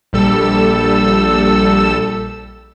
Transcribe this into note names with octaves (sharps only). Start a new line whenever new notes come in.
A#1 G3 A4 E6